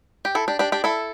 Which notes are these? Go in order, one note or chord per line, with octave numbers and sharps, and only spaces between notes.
G4
E4 A4
D4 G4
D4 G4
D4 G4
E4 A4